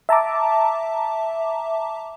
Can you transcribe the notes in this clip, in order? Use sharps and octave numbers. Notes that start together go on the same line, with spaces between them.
E5 A5 A#5 D6